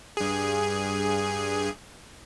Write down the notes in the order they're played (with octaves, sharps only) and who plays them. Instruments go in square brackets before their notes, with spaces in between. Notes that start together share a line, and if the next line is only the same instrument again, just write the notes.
[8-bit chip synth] G2 G#4